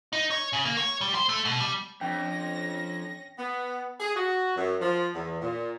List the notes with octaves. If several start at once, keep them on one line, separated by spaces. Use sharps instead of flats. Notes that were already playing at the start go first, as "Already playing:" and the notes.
D#4
C#5
C#3
A#3
C#5
G3
C5
A3
B2
G3
F2 C#4 D4 G5 A#6
B3
G#4
F#4
F#2
F3
E2
A#2